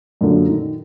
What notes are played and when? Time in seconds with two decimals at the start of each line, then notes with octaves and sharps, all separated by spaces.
0.21 F#2 A#2 D3
0.49 D#3